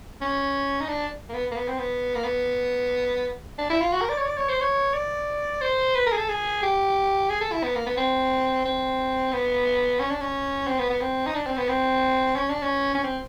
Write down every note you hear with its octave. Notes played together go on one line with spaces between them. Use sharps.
C#4
D#4
D4
A#3
B3
A#3
B3
C4
B3
A#3
B3
D4
E4
F4
F#4
A#4
D5
C#5
D5
C#5
C5
C#5
D5
C5
B4
A#4
G#4
A4
G#4
G4
G#4
A4
E4
B3
A#3
B3
C4
C4
B3
C#4
D4
C#4
C4
B3
B3
C4
D#4
D4
C4
B3
C4
C#4
D4
C#4
C#4
C4